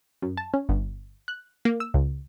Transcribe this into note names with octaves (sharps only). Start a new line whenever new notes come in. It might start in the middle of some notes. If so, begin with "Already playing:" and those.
F#2
A5
C#4
G1
F#6
A#3
E6
C#2